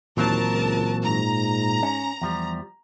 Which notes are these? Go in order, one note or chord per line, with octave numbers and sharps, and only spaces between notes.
D#2 A#2 E3 F#3 C4 A#4 A5
C#2
G#2 A#5
C#4
E2 F3 G3